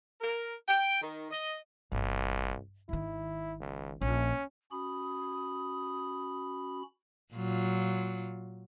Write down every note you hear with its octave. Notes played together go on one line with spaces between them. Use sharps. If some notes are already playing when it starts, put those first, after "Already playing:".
A#4
G5
D#3
D#5
G1 C2
G#1 D#3 E4
C#2
A#1 C#4 F4
C#4 F#4 B5 D#6
A#2 F#3 F4